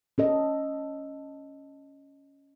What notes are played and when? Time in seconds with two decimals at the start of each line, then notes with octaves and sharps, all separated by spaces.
0.18 C#4 A4 D#5